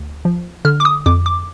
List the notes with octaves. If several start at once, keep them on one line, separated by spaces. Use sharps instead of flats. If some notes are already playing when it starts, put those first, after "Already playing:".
Already playing: D2
F3
D3 F6
D6
D#6
F2 D6
D6